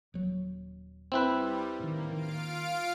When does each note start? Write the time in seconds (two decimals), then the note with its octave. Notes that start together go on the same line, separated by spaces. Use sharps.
0.14 D#1 F#3
1.12 G3 C4 E4 B4
1.80 A2 D#3 A#3
2.12 D#3 F4 F5 D7